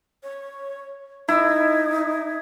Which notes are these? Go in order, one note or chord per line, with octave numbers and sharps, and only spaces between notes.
C#5
D#4 E4